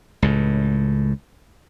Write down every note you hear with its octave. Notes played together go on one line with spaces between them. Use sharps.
C#2 A2